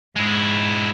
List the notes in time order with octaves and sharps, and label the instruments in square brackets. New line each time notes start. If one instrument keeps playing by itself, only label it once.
[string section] G#2 [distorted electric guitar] G#3 E4